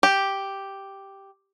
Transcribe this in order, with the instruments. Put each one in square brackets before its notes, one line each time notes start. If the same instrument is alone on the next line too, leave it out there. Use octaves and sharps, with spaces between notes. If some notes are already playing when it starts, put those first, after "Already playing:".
[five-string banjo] G4